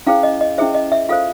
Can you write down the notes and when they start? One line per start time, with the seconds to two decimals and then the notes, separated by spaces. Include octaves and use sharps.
0.07 C#4 E4 G#4 C5 F5
0.23 D#5
0.41 D#5
0.58 C#4 E4 G#4 C5 E5
0.75 D#5
0.92 E5
1.09 F4 A4 C5 F5